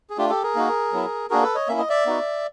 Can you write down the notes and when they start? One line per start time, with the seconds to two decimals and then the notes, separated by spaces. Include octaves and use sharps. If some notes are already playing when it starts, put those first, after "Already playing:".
0.10 G#4
0.18 A3 D4 F4 G4
0.30 G4 A4
0.43 G#4 A#4
0.55 A#3 D#4 F#4
0.93 F#3 B3 E4
1.30 A#3 D4 F#4 G#4 A#4
1.43 A4 B4
1.55 C#5 D#5
1.68 A#3 C#4 E4 E5
1.78 D#5
1.89 D5 E5
2.06 B3 D#4 F#4